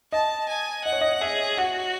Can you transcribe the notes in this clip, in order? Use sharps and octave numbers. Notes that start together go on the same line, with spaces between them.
D#5 A5
G#5
D#5 F#5
C#5
D#5
G#4 E5
F#4 F#5